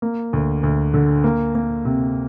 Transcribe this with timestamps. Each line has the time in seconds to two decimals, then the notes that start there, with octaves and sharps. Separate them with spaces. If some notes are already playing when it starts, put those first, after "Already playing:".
0.02 A#3
0.33 D2
0.63 D2
0.94 D3
1.24 A#3
1.55 A#3
1.85 C3